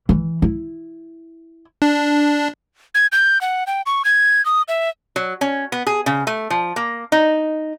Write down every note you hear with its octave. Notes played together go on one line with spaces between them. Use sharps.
E3
E4
D4
G#6
G6
F#5
G5
C#6
G#6
D#6
E5
F#3
C#4
B3
G#4
C#3
A3
F3
A#3
D#4